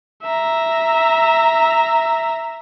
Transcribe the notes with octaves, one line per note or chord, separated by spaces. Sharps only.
E5 A#5